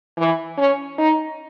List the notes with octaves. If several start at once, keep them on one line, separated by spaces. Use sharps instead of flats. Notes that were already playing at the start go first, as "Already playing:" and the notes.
E3
C#4
D#4